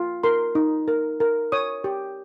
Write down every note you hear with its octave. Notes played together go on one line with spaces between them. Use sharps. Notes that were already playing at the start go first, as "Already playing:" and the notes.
Already playing: F4
A#4 C6
D#4
A#4
A#4
C#5 D#6
G4